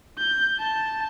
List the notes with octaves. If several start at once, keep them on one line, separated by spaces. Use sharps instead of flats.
G6
A5